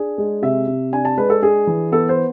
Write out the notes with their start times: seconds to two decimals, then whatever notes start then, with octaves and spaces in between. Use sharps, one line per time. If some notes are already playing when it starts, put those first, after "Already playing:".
Already playing: D4 G#4
0.18 G#3
0.42 C3 E5
0.67 C3
0.92 D4 G#5
1.05 A5
1.17 G#3 B4
1.30 A4
1.42 D4 G#4
1.67 E3
1.92 B3 A4
2.09 C5